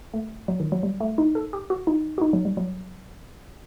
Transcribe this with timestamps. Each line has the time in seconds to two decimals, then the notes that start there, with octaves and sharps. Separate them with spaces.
0.14 A3
0.48 F#3
0.60 D#3
0.72 F#3
0.83 G3
1.00 A3
1.18 D#4
1.35 A4
1.53 G4
1.70 F#4
1.87 D#4
2.18 F#4
2.21 D#4
2.33 F#3
2.45 G3
2.57 F#3